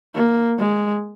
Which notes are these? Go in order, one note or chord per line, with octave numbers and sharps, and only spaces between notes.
A#3
G#3